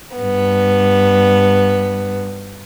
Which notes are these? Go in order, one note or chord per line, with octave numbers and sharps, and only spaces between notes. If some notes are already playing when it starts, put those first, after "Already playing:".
G2 B3